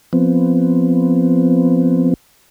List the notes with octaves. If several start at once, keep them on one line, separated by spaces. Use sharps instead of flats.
F3 B3 C4